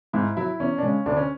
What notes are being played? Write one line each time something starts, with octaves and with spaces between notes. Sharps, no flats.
G#2 E4
F#3 E4
E2 C#4
D4
C#3 G#3 C#4
D2 D4
C#4